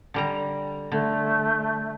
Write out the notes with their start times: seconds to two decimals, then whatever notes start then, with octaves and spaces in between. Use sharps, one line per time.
0.14 D3 G3 A#5
0.92 D3 A3